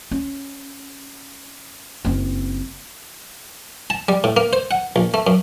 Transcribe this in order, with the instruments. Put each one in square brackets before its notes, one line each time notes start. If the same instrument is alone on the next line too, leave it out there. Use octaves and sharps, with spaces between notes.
[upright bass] C#4
F#1 C4
[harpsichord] A5
G3
A2
A#3
C5
F#5
A#1
A3
F#2